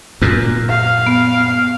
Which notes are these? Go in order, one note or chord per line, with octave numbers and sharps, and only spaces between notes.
F#2 A#2
F5
B3